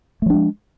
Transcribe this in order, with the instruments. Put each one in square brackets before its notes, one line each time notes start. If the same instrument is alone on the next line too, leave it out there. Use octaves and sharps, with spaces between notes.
[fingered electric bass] A3
F3
D4
G#3